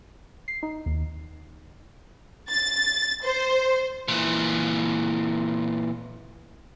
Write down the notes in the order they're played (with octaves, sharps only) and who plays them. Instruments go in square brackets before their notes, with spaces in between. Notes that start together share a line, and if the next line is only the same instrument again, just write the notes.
[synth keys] C7
D#4
D#2
[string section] A6
C5
[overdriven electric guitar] A#2 E3